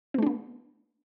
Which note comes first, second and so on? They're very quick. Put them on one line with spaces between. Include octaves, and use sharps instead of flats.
C4 A3 D4 B3